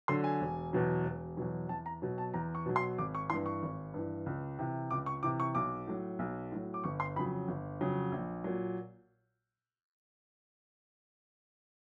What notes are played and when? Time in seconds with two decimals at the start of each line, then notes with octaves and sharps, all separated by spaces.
0.08 D3 F#3 C6
0.24 G#5
0.41 E1
0.73 E2 B2 F#3
1.05 E1
1.37 E2 B2 F#3
1.69 E2 A5
1.86 A#5
2.02 B2 F#3
2.18 A5
2.34 E2 A#5
2.55 C#6
2.66 B2 F#3
2.76 C6
2.98 G#1 D6
3.15 C#6
3.30 E3 C6
3.33 G2
3.46 C#6
3.63 G#1
3.94 G2 E3
4.26 C#2
4.59 C3 E3
4.91 C#2 D6
5.06 C#6
5.23 C3 E3 D6
5.40 C#6
5.55 B1 D6
5.87 A2 F#3
6.19 B1
6.52 A2 F#3
6.74 D6
6.84 G1 C#6
7.00 C6
7.16 F2 C#3 F#3 B5
7.48 G1
7.80 F2 C#3 F#3
8.12 A#1
8.44 A#2 F#3